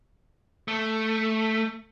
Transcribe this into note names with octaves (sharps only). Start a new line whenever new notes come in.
A3